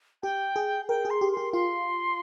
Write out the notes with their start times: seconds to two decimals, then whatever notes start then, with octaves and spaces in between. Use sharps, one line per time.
0.23 G4 G5
0.56 G#4
0.88 A#4 G5
1.05 G#4
1.10 C6
1.21 G4
1.32 G4 C6
1.53 F4 C6